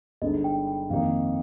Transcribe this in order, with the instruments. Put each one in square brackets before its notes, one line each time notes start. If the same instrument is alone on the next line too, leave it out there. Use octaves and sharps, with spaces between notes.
[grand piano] G1 G2 D3 G#3 D#4 [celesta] D#5
[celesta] G5
G5
[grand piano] F2 D#3 A#3 D#4 [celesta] F5